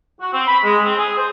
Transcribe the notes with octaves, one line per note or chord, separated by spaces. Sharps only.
F#4
C4
B5
G#3
C4
G#4
C5